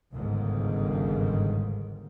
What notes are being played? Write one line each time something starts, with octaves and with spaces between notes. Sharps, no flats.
G1 C#2 G#2 D#3